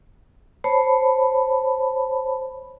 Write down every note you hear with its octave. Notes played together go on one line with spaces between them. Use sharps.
C5 C#5 A5 B5